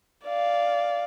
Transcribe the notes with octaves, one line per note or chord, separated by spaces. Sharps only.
D5 F5